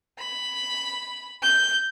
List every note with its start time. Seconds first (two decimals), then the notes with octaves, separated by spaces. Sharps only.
0.19 B5
1.43 G6